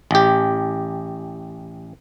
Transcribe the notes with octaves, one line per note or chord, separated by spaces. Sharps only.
A1 G4